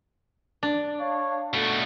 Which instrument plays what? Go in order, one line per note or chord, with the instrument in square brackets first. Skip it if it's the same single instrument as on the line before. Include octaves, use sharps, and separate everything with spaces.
[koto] D4
[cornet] C#5 [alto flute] F5
[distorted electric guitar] B2 A3 [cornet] F#4 [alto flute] A4